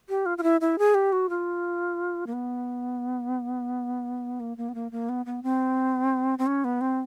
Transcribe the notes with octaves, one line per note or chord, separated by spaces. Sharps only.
G4
F4
F4
E4
E4
G#4
G4
F#4
F4
A#3
B3
A#3
A#3
B3
A#3
A#3
B3
B3
C4
C4
C#4
B3
C4